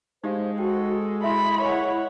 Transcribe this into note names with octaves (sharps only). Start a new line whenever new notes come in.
G#3 D#4 G4 C5 F5
F#4 A4 G5
E4 E5 B5 C6
A#4 C#5 D#5 F#5 G#5